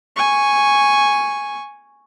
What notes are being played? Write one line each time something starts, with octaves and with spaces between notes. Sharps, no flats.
G#5 C#6